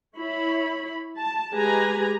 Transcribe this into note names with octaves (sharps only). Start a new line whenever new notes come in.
E4 C#5 B5
A5
G#3 G4 G#4 B4 G#5 A#5